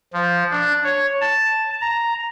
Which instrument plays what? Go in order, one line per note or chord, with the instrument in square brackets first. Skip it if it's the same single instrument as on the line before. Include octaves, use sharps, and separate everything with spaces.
[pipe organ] F3
D4
C#5
A5
A#5